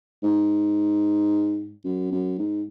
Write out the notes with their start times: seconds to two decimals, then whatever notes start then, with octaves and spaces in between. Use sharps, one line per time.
0.23 G#2
1.85 F#2
2.12 F#2
2.38 G#2